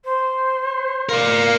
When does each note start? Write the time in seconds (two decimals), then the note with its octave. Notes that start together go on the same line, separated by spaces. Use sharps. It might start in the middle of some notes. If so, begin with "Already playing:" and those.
0.04 C5
1.09 A#4 D5 F5